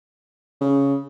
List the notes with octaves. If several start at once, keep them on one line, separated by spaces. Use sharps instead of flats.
C#3